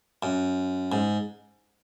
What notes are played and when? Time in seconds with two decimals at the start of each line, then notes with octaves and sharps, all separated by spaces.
0.23 F#2
0.92 G#2